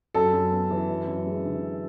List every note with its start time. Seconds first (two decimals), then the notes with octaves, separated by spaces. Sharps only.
0.14 F#2 A4
0.33 F#2
0.51 B3
0.71 E3
0.89 F#2
1.07 F#2
1.26 G#3
1.45 D3